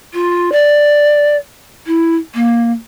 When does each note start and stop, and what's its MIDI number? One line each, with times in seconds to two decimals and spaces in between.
0.14 0.50 65
0.52 1.36 74
1.86 2.15 64
2.34 2.72 58